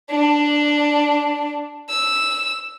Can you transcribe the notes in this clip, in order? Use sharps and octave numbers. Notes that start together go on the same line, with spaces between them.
D4
E6